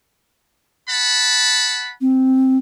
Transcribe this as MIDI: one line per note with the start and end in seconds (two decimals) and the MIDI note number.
0.89 1.94 78
0.89 1.94 81
0.89 1.94 83
2.01 2.57 60